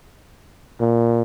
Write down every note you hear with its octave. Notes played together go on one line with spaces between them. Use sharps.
A#2